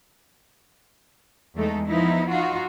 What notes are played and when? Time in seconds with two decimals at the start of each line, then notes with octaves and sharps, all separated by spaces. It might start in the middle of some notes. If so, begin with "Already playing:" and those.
1.56 E2 G#3 A3 D#4 A4
1.87 F3 B3 D#4 E4
2.30 D#4 F4 F#4